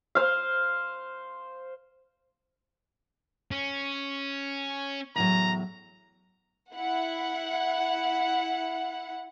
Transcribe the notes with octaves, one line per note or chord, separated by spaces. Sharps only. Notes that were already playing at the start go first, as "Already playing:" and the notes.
C5 F5
C#4
E2 A2 F#3 A#5
E4 F#5